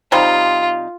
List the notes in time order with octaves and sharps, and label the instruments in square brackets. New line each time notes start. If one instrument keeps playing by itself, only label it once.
[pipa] C3 G3 D#4 [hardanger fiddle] F4